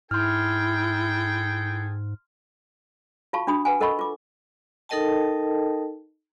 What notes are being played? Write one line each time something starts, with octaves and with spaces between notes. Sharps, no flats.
G#2 E4 G#4 A4 G5 C6 F6
F4 F#4 F5 A5 C#6
D4 F#4 B5 D#6
B4 F#5 G#5
A4 A#4 D#5 F#5 B5 C#6
F4 D6
D#4 A4 A#4 D#5 G5 A5